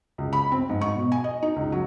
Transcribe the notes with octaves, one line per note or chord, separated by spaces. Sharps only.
C#2
B5
C4
G#2
C#6
B2
G#5
D#5
D#4
C#2
F#3